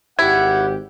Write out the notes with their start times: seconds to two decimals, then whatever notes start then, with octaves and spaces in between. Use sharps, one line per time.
0.19 G#1 E4 G4 F#5 G#6